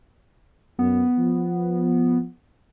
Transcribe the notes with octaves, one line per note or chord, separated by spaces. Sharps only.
F#2 B3
F3